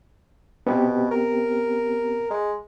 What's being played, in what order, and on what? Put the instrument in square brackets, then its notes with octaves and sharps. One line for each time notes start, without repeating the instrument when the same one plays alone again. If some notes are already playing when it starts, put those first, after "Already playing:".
[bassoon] B2 [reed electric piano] B3 C4 G4
[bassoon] A#4
G#3